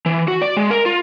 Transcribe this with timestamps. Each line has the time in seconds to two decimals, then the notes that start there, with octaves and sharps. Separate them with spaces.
0.06 E3
0.28 F#4
0.42 D5
0.57 G#3
0.71 A#4
0.86 F4